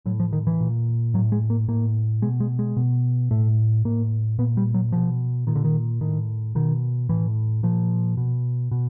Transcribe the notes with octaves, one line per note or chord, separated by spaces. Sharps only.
A2 F#3
F3
D#3
E3
A#2
A2 F#3
G#3
A#3
A2 A#3
B2 G#3
G#3
G#3
B2
A2 A3
A2 A#3
A#2 B3
G3
F#3
B2 F3
A#2 D#3
D3
D#3
A2 D#3
B2 D#3
A2 E3
A#2 F3
B2
B2